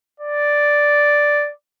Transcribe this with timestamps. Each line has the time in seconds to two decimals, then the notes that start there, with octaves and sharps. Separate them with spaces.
0.20 D5